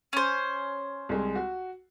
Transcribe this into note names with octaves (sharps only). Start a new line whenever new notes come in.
C#4 C5
C2 G#3
F#4